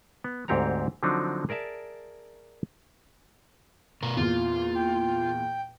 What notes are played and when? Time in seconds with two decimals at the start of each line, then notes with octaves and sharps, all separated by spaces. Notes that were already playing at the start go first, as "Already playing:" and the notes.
0.24 B3
0.48 D2 G#2 C4 G4 C#5 A#5
1.03 D3 F3 F#3 C4 D4 D#4
1.49 G#4 A#4 D5 E5 A5
4.03 B2 A#4
4.17 E2 A#2 F4
4.75 G5